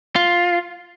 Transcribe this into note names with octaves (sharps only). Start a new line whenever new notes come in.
F4